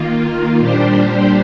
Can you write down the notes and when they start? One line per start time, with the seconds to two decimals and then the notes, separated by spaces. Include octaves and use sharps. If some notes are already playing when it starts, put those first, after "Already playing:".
Already playing: D#3 A#3 F4
0.59 A#2 G3 D4 G4 C5